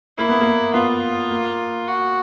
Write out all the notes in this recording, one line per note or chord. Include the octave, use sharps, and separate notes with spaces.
A#3 E4
B3
A#3
B3 F4
A#3
F#4